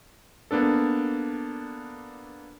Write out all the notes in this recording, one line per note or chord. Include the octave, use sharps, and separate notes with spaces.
A#3 B3 D4 A4